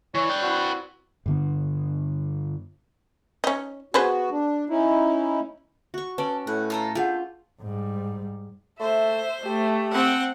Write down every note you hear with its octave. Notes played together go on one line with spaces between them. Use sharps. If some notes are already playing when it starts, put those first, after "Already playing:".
E3 C#5 D5
B4 G5
C4 E4 F#4
G2 D3 B3
C#4 D#4
B3 F#4 G#4 B4 C5
D4
C#4 D#4 E4
F#4 C#6
C#4 A4 B4 D5
A2 F#5
F4 A4 A#5
A3 D4 F4 G#4 F#5 G6
G#2 G3
A3 C5 E5
A3 G4
C4 F#5